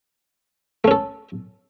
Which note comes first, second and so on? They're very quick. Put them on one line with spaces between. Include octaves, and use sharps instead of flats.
A3 C#4 A4